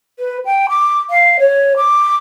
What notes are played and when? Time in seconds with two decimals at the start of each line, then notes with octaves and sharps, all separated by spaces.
0.19 B4
0.45 G5
0.69 D6
1.10 F5
1.39 C#5
1.77 D6